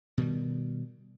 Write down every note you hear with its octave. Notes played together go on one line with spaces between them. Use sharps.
B2 D#3 G3